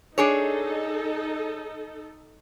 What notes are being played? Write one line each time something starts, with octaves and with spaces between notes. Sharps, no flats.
D4 D#4 G#4 A4 C#5